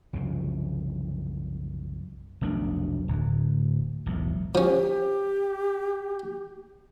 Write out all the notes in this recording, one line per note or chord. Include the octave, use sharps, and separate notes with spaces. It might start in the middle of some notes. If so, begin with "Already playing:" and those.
C2 F#2 C#3 F3
F1 B1 A3 D4
D1 D2
E1 B1 A2
F3 C#4 G4